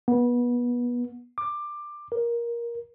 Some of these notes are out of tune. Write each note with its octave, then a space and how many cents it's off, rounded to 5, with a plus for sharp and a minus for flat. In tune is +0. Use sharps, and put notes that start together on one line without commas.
B3 -25
D6 +15
A#4 +15